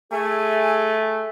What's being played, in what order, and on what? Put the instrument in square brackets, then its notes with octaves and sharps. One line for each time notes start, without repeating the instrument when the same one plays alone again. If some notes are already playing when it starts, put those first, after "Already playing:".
[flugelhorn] A3 [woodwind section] E4 G#4 G#5